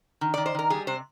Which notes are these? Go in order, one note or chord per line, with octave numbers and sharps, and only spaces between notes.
D#3
D5
D#3
C5
D#3 A#4
G3 G#4
C3 C5